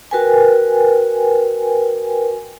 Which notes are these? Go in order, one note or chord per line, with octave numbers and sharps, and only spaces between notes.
F#4 A#4 B4 G5 G#5